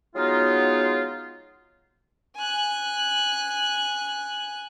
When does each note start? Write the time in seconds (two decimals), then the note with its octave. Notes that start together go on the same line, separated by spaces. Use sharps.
0.16 F#3 G#3 B3 D#4 F4
2.36 G#5 F#6